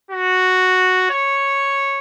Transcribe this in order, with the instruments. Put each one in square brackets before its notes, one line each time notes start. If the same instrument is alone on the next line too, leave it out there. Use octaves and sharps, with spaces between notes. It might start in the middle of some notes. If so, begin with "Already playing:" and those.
[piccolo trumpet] F#4
C#5